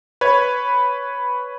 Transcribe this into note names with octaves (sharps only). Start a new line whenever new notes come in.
B4 C#5 G#6